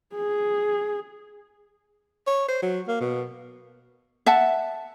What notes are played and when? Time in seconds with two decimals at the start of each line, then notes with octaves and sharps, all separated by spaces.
0.15 G#4
2.27 C#5
2.48 C5
2.62 F#3
2.88 A#3
3.01 B2
4.26 E5 F#5 A5